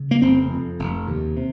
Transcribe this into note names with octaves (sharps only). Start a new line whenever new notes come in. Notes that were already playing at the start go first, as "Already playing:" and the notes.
Already playing: C#3
A#3
F1 C4
F2
F1
D#2
C3